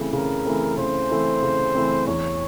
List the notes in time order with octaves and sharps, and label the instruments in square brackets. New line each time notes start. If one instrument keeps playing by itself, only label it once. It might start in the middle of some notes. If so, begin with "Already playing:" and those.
Already playing: [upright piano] C#3 E3 A3 C4
[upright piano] C#3 [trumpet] A#4
[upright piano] E3 A3 C4
[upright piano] C#3 [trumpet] C5
[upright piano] E3 A3 C4
C#3
E3 A3 C4
[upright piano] E2 [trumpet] C#5